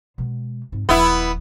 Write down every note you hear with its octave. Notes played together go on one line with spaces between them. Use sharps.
B2 G#3
G#2 C4
D#1 F3 B3 E4